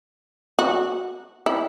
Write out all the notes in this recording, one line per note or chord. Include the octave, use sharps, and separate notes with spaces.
F#4
E4